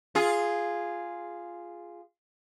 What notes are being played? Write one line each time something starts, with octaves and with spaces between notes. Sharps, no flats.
F4 G#4